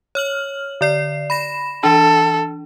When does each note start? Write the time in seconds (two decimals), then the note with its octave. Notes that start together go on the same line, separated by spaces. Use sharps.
0.15 C#5 F6 F#7
0.81 D3 D5 C7
1.30 B5 A#6 E7
1.83 E3 D4 A4